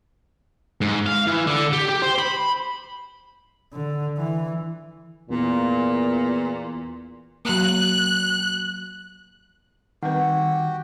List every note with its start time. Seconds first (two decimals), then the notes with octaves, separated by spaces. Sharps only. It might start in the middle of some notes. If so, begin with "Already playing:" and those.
0.81 G#2
1.07 F5
1.27 E3
1.47 D3
1.73 G4
1.89 G4
2.02 C5
2.18 B5
3.73 D3
4.18 E3
5.30 E2 A#2
7.45 F#3 A#3 F#6
10.03 D#3 G3 C4 F#4 G4 B4 F#5 G5